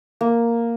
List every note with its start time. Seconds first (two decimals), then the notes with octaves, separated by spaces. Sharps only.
0.21 A#3